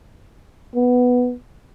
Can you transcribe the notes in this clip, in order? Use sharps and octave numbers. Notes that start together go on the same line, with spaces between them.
B3